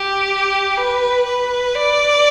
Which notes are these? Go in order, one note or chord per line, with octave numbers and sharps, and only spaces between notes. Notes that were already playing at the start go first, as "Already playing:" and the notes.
Already playing: G4
B4
B4
D5